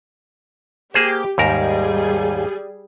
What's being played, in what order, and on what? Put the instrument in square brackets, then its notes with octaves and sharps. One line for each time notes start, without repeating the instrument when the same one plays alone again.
[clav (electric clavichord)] A#3 G#4 C5 [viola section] G4
[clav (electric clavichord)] D#2 G#2 A#4 [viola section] G3 G#4